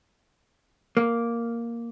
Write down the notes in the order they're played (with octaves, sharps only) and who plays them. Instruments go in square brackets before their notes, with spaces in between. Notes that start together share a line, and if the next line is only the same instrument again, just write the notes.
[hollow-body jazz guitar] A#3